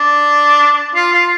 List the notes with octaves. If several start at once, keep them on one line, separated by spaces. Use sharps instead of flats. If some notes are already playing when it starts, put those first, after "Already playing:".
Already playing: D4
F4
F4